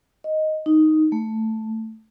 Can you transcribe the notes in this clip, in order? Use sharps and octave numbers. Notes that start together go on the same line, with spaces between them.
D#5
D#4
A3